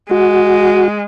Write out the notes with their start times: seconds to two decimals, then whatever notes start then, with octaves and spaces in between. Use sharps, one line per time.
0.11 G#3 F#4